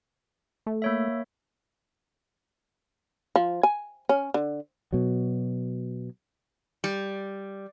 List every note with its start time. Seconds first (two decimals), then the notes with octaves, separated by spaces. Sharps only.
0.67 A3
0.82 A#3 C#5 E5
3.36 F3
3.63 G#5
4.09 C#4
4.34 D3
4.93 B2 F#3
6.84 G3